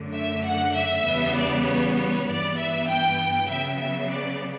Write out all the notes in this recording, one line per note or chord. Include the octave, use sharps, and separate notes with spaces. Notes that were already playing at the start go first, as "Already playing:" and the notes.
Already playing: F#2 D3 F#3 A3
E5
F#5
E5
E2 C#3 G3 B3
D5
C#5
C#5
G2 E3 B3 D5
E5
G5
C#3 F#3 B3 E5
E5
D5